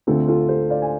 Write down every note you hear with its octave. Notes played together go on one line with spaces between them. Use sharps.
D2 D3 A3 C4 F4 A4
F4 A4
A4 C5
D5 F5
G#5